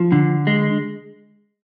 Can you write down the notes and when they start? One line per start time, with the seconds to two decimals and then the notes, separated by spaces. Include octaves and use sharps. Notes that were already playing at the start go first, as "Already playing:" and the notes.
Already playing: F3
0.12 D3
0.47 G#3